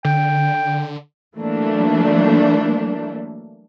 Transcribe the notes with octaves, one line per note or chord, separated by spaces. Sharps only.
D3 G5
E3 F#3 A3 A#3 D4